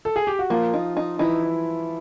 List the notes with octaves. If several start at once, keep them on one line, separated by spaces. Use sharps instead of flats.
A4
G#4
G4
F#4
F3 A#3 F4
D#4
D#4
E3 D#4 E4